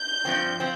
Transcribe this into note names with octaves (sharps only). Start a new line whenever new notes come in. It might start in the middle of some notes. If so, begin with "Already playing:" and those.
Already playing: G6
G2 F3 C4
F3 C4